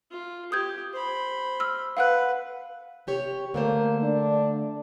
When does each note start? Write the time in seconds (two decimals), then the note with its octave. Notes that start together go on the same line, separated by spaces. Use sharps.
0.11 F4
0.52 G4 D#6 G6 G#6
0.93 C5 B5
1.60 E6 F6
1.97 B4 F5 F#5 F#6
3.07 C3 G4 C#5
3.54 D3 A3 A#3 C5
4.03 D4